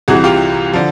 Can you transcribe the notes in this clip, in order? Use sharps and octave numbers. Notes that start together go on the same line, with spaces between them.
C2 C3 E3 F#4 G#4
F4 G4
D3 F3